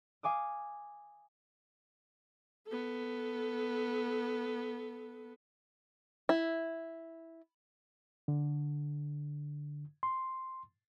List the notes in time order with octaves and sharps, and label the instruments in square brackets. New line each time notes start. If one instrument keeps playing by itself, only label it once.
[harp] F5 G#5 D6 D#6
[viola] B3 A4
[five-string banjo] E4
[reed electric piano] D3
C6